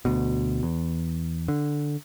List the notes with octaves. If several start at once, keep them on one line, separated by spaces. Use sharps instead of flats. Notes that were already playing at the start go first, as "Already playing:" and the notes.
D2 B2
E2
D3